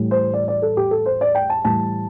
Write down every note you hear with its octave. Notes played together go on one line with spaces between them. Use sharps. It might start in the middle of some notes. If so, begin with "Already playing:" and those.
Already playing: A2 E3 G3
C5
D5
D5
A4
G4
A4
C5
D5
G5
A5
A2 E3 G3 A5